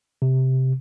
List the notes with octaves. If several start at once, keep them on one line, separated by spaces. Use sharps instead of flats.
C3